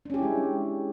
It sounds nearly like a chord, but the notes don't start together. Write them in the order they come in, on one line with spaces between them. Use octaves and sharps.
D4 C#4 G4 E4 G#3